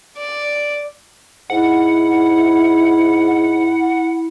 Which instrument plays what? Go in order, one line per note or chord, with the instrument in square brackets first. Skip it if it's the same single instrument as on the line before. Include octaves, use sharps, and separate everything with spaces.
[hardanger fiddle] D5
[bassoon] G#2 [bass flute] E4 [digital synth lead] F#5